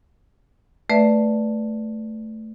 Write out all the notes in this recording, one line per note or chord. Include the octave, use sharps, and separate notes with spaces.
A3 B4 D5 E5